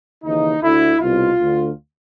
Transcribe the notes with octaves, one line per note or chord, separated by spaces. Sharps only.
D#2 C#3 E3 D#4
D2 D3 E4
C2 B2 F4
D2 D3